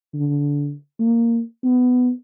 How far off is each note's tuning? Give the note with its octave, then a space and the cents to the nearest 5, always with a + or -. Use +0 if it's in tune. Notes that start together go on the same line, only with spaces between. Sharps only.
D3 -25
A#3 -10
B3 +15